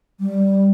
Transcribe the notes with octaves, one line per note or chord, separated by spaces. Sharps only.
G3